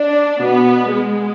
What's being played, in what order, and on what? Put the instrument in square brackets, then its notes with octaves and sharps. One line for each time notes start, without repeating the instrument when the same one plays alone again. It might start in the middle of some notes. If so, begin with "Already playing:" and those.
Already playing: [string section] D4
[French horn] B2 [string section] B3
[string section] G#3